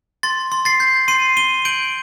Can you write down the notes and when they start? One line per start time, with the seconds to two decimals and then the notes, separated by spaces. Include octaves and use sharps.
0.23 C6 A6
0.52 C6
0.65 A6 C7
0.80 G6
1.08 C6 C7 D#7
1.36 C6 D#7 G7
1.65 G6 D7 F#7